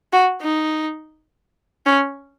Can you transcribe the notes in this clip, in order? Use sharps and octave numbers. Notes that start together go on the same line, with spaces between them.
F#4
D#4
C#4